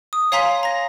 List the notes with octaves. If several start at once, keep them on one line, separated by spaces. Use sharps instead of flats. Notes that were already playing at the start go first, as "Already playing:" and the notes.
D#6
C#5 F5 G#5 A#5 C6 B6
A#5 A#6